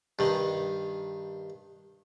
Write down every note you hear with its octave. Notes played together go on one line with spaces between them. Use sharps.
G2 D#3